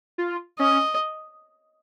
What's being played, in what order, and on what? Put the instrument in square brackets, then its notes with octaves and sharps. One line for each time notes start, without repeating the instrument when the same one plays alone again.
[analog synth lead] F4
[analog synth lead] C#4 [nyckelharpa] D#5